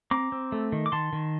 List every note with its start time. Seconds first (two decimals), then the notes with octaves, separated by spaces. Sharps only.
0.11 C4 A#5 D6
0.32 C4
0.52 A3
0.72 D#3
0.86 D6
0.92 D#3 A5 C6
1.13 D#3